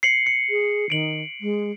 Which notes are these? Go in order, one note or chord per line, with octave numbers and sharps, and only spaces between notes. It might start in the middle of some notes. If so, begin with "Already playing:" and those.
C7 C#7 F#7
C#7
G#4
D#3 D7 F#7
G#3